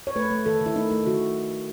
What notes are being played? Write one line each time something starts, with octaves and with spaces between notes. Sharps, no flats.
C#5
A3 B4
A3
D#3 A4
D#3
E4
A3 D#4
A3
D#3 F#4